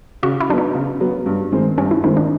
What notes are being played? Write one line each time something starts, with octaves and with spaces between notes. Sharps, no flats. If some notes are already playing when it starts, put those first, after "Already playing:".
C#3 F#4
E4
F#3 B3 D4 D#4
C#3
F#3 B3
G2
D#3 G#3 C4
G2 C#4
E4
D#3 G#3 C4 D#4
D4